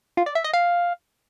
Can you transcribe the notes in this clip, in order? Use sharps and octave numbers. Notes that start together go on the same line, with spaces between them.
F4
D5
E5
D#5
F5